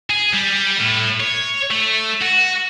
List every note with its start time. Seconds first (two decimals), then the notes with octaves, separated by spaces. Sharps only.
0.10 G#4
0.33 G3
0.79 A2
1.20 C#5
1.71 A3
2.22 F#4